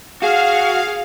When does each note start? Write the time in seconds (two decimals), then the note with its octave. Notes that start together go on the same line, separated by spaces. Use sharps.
0.22 F#4 G#4 F5